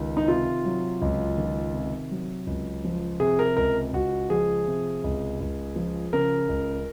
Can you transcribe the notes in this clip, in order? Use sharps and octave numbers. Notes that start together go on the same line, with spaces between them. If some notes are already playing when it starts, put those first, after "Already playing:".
Already playing: C#2 D#3
D#4
C3 F4
F#3
C#2
D#3
C3
F#3
C#2
F3
C3 G#4
A#4
C#2 A#4
C#2 F#4
F3 G#4
C3
C#2
C#2
F3
C#3 A#4
C#2